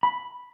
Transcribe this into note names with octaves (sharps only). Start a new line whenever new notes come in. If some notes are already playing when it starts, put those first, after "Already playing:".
B5